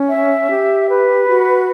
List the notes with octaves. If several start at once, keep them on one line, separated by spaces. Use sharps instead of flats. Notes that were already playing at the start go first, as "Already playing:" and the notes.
Already playing: C#4
E5
G4
B4
F#4